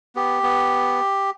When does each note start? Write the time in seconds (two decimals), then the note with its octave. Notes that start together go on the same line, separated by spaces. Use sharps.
0.15 B3 G4
0.43 B3